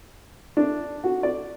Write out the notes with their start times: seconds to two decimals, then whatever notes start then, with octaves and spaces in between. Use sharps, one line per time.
0.57 D4
1.04 F#4
1.23 D5